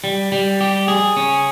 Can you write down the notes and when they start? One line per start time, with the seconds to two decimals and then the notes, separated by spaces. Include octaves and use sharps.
0.04 G3
0.32 G3
0.61 G4
0.88 G#4
1.17 C#4